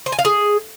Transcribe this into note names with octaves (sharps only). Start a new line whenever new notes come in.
C5
G#5
F5
G#4